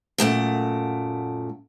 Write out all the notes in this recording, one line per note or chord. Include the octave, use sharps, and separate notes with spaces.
F#2 A#2 A3 F#5